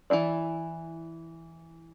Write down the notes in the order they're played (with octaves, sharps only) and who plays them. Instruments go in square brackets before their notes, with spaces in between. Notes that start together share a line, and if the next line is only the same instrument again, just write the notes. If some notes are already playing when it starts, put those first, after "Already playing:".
[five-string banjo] E3 D#4 E4 D5